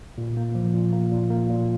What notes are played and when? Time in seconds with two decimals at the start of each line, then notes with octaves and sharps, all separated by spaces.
0.18 A#2
0.37 A#3
0.55 F3
0.73 A#2
0.93 A#3
1.12 A#2
1.31 A#3
1.50 A#2